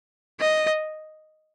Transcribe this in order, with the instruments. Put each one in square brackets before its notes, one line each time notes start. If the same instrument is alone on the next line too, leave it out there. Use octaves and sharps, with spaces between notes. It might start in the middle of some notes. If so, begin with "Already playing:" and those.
[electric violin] D#5